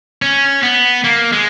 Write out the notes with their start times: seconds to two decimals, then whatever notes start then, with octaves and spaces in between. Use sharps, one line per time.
0.22 C#4
0.63 B3
1.04 A#3
1.33 G#3